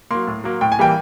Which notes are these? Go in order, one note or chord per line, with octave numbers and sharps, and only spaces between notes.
F#3 A#3 C6
A2
F#3 A#3
A2 G5
G#5
E3 G3 A#3 G5